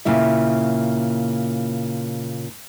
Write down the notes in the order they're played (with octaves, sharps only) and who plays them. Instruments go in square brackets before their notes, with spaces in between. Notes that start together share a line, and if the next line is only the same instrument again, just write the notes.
[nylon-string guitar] A#2 C#3 E4 E5